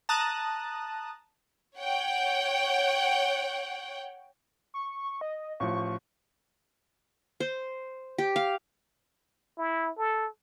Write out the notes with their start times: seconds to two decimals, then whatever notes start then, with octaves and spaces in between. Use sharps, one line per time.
0.09 A5 A#5 D#6 F#6
1.78 C#5 F#5 G5
4.74 C#6
5.21 D#5
5.60 A1 F3 C#6
7.40 C5
8.18 G4
8.36 F5
9.58 E4
9.97 A4